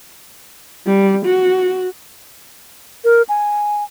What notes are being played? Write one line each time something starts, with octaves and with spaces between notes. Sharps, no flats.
G3
F#4
A#4
G#5